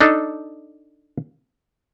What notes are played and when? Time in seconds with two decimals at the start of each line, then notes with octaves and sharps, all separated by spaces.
0.01 D4 D#4 A4